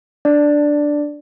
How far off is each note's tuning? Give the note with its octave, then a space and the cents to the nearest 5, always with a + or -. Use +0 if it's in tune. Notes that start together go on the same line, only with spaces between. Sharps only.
D4 +0 D5 +0